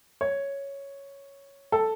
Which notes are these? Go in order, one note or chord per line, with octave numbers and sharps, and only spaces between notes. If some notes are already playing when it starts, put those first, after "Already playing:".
C#5
A4